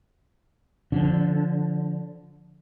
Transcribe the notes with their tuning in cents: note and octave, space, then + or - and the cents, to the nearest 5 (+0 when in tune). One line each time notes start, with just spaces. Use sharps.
D3 -5 F3 -5 D4 -40